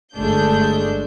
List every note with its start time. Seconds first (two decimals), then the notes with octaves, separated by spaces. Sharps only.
0.14 G1 G#3 A3 D4 G6